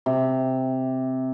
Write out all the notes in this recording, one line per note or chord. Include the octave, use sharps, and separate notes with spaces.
C3